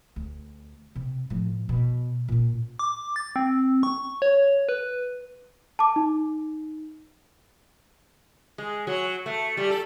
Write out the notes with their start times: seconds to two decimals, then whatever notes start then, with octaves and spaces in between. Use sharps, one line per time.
0.16 D2
0.95 C3
1.30 A2 F3
1.69 B2
2.28 A#2 C#4
2.79 D6
3.16 A6
3.36 C4
3.83 C#6
4.22 C#5
4.69 B4
5.79 A5 D6
5.96 D#4
8.58 G#3
8.87 F#3
9.26 A3
9.57 G3
9.70 A4